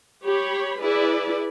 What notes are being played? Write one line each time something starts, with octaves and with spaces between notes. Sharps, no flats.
G4 C#5 B5
E4 G#4 B4 D5